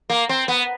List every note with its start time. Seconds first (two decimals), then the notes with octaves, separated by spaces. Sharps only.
0.10 A#3
0.29 C4
0.48 B3